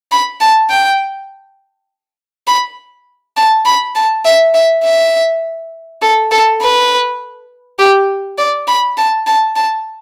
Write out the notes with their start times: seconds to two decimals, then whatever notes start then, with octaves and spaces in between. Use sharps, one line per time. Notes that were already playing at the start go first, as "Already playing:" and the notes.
0.12 B5
0.41 A5
0.70 G5
2.48 B5
3.37 A5
3.66 B5
3.95 A5
4.25 E5
4.55 E5
4.84 E5
6.02 A4
6.31 A4
6.61 B4
7.79 G4
8.38 D5
8.68 B5
8.98 A5
9.27 A5
9.56 A5